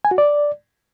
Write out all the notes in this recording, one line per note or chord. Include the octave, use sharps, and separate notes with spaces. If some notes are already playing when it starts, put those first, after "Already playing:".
G#5
F#4
D5